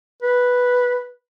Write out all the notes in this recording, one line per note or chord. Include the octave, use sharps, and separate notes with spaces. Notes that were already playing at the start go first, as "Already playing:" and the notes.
B4